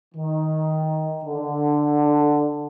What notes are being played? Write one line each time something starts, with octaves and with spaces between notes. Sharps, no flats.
D#3
D3